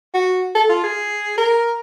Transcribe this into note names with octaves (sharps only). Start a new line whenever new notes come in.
F#4
A4
F4
G#4
A#4